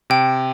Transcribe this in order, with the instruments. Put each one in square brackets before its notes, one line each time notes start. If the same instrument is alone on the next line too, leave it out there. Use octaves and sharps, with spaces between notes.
[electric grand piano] C3 [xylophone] G5